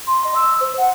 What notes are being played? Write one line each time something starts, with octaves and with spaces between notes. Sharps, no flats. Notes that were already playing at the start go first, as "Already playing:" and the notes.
C6
D#5
E6
C5
F#5